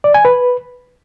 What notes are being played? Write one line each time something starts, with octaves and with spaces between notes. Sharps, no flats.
D5
G#5
B4